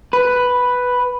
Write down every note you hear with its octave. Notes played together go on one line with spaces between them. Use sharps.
B4